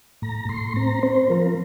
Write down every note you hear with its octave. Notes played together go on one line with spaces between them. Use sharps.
A2 A#5
A2 C6
C4 A#5
C4 C5
F3 A#4